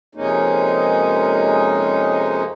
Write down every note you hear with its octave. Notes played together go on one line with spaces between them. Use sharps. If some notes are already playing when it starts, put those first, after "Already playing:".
F2 C3 G#3 A#3 C#4 D#4